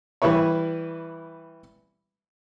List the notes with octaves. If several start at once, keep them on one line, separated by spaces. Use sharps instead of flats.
E3 G3 E4 B4 C#5